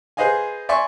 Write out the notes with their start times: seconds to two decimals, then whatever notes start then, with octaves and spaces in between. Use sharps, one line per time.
0.17 G#4 B4 C5 D#5 F5 G#5
0.69 D5 E5 G#5 C6 C#6